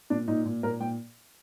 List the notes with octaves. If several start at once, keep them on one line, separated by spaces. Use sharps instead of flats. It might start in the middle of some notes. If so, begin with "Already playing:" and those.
A#2 D4
A#2 D#4
A#2
A#2 A#4
A#2 G5